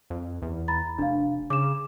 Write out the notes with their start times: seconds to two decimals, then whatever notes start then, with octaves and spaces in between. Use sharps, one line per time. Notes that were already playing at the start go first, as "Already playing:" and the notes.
0.10 F2
0.42 E2
0.68 A#5 B5 A6
0.98 F1 D4 F5
1.50 C#3 D6 E7